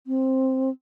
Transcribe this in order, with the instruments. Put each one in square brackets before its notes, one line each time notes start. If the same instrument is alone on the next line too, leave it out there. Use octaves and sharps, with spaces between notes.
[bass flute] C4